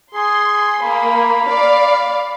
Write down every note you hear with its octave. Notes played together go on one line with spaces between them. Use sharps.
G#4 C6
A#3 B5
D5 F5